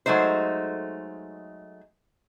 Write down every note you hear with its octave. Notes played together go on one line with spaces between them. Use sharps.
F#3 G#3 A3 D#4 C5